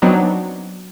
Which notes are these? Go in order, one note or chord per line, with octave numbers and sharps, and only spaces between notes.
F#3 B3 C4 D4 D#4